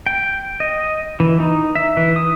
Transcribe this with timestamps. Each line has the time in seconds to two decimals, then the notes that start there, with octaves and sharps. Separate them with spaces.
0.06 G5
0.60 D#5
1.20 E3
1.40 D#4
1.75 E5
1.97 E3
2.16 D#6